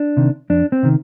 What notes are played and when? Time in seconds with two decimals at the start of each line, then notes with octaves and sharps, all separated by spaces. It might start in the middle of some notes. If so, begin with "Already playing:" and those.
Already playing: D4
0.17 C3 D#3
0.50 F2 D4
0.72 C4
0.83 C3 D#3